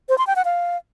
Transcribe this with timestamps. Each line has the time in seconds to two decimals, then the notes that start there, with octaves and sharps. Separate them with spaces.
0.09 C5
0.18 C6
0.27 G5
0.36 F#5
0.45 F5